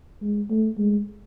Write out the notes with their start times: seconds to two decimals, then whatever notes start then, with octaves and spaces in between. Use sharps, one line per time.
0.21 G#3
0.50 A3
0.78 G#3